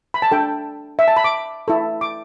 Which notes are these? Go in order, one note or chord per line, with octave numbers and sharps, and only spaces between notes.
B5
A5
D4 A4 G5
E5
A5
B5
D6
E4 A4
D6